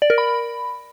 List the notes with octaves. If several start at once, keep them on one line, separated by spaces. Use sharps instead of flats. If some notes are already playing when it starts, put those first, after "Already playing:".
D5
A#4
B5